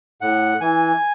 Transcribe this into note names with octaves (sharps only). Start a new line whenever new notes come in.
A2 F#5
E3 G#5